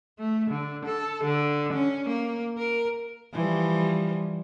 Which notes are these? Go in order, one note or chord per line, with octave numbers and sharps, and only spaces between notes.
A3
D3
A4
D3
C#4
A#3
A#4
E3 F3 G3